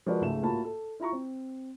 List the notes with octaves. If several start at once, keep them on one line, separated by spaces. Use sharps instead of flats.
F3 G#3 F#4 A#4 B4 D5
C#2 G#2 A3 E7
A2 A#3 F4 F#4 A5 B5
A4
E4 F4 A#5 C#6
C4